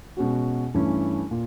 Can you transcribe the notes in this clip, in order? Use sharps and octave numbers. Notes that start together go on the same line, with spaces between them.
B2 G#3 C#4 F#4
G2 E3 A3 C#4 E4
A#2